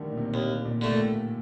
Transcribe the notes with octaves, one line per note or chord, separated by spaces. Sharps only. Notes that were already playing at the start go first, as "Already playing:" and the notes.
Already playing: D3 D#3 G3 A3
A#2
C3
A#2
D#2 C3
A#2
D3 A3
A#2
A2